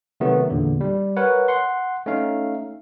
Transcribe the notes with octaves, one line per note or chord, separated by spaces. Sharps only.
C3 D#3 F#3 A3 B3
E2 A#2 D3
G3
A#4 B4 C#5 F#5
F#5 C6
A3 C#4 D#4 F5